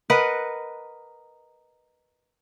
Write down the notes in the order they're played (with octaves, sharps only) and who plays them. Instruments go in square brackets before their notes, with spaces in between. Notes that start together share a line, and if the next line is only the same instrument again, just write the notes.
[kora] A#4 B4 D#5 F#5